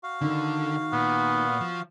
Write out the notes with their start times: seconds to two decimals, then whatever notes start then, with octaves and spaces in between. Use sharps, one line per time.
0.03 F#4 F5
0.21 D3 D#3
0.93 A#2 B3
1.61 F3